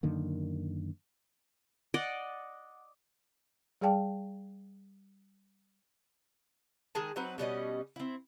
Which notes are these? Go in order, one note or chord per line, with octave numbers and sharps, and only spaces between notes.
F#2 D3 D#3 A#3
D5 D#5 F#5
G3 G#4 D5 F5 G5 A5
D#3 G#3 G#4 A5
F#3 C4 D#4 B4
B2 G3 C#4 D#5
C4 E4